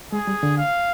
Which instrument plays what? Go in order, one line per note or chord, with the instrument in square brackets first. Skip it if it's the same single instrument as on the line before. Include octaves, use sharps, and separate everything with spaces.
[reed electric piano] G#3 [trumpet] G#4
[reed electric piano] G3
D3
[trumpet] F5